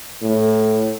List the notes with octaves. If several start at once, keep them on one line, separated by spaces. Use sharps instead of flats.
A2